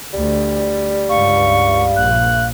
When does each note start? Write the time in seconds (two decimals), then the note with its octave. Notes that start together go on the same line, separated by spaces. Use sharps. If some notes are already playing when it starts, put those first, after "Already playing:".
0.13 D2 G3
1.09 C#2 G2 F5 C#6
1.96 A#1 F#6